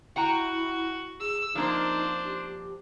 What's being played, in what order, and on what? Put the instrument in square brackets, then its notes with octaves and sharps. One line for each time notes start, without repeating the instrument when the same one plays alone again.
[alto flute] E4 [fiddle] F#4 [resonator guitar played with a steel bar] F#5 G5 A#5
[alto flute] G#4 [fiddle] E6
[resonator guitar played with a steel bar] F3 A#3 C4 [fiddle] D4 C5 [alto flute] D#4
[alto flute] G4